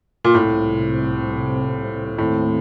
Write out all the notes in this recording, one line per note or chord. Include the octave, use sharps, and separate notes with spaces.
A#2
C2 A2 C3 G3 C4
D#2 A2 D#3 A3 C4